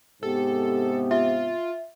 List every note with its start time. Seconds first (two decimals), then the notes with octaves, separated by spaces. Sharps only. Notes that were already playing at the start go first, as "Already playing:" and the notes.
0.23 G#2 C3 B3 G4 A4
1.11 F4 E5